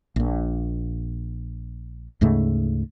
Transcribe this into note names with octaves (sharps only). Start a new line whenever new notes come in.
A#1 A#2
D2 G#2 C#3 A3